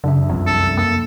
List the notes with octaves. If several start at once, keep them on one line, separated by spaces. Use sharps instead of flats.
F#2 C#3 D4 E5
C2 F2 F3
A4
A#3 A4